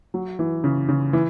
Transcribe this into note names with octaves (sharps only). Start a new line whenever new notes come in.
F#3
E3
C#3
C#3
E3